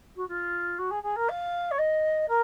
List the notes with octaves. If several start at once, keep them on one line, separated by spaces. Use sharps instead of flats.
F#4
F4
F#4
G#4
G#4
A#4
F5
C#5
D#5
A#4